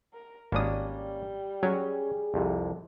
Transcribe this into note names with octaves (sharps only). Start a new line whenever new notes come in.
A#4
G#1 G3 A#3 C#4 D4 D#6
F#3 C#4 G#4 C#5
C2 F2 C3